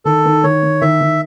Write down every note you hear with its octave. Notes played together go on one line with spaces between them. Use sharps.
D#3 A4
D#3
D#3 C#5
D#3
D#3 E5
D#3